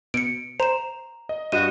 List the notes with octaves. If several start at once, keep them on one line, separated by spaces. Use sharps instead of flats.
B2 C#7 D7
C5 A#5 E7
D#5
G2 F#4 D#5 D#7 E7